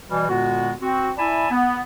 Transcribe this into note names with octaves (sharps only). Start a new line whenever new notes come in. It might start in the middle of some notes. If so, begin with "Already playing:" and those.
B2 E3 G3
A#2 D3 G#3 B3 F#4
C4 F#4
E4 D5 E5 G#5 A5 B5
B3